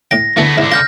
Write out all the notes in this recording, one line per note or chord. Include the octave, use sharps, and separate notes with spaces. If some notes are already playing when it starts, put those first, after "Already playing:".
A2 G5 A#6
D2 E3 A3 B3 A4
C#2 G#2 D3 E4
F4 F6 G6 A#6